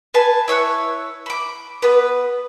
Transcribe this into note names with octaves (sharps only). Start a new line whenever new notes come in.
B4 G#5 A5
E4 C#5 E5 F#6
B5 D6
B3 B4